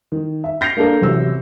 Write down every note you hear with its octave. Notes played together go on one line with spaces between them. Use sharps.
D#3
E5
G6 A#6 C7 C#7 F7
A#3 D4 A4 A#4
A1 C3 F#3 E6